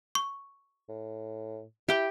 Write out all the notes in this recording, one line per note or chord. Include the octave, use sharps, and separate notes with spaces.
C#6
A2
E4 G4 G5